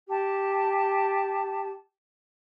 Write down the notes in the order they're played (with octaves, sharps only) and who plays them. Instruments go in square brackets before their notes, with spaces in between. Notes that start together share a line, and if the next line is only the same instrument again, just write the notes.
[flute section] G4 A5